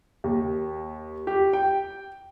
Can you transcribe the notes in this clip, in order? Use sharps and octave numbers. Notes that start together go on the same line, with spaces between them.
D#2
G4
G5